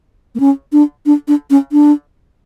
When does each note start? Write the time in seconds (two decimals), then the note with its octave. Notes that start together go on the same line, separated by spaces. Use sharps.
0.35 A#3
0.40 C#4
0.72 D4
1.06 D4
1.28 D4
1.50 C#4
1.72 D4